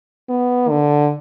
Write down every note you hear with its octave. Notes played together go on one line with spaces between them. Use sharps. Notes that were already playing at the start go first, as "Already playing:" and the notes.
B3
D3